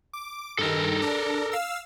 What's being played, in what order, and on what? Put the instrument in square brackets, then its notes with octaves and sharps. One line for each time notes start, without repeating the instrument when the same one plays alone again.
[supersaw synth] D6
[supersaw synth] G2 D#3 [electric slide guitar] A4 A#4
[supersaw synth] D4
F5 E6